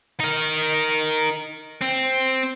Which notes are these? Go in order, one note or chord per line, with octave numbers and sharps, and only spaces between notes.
D#4 A#4
C4